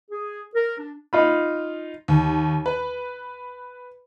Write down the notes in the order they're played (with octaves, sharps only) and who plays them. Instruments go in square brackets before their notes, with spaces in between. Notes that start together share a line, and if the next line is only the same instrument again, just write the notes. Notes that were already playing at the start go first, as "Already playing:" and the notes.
[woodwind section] G#4
A#4
D4
[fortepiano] D#4 F4 B5
[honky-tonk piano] D#2
B4